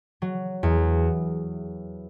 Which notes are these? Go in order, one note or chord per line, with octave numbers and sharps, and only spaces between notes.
F#3
E2